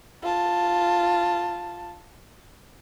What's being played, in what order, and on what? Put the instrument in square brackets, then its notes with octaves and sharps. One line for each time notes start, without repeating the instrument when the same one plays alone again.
[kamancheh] F4 A5